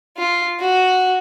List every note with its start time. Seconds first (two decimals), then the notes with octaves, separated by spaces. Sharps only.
0.17 F4
0.60 F#4